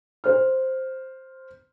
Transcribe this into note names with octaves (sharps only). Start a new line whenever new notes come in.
C5 F6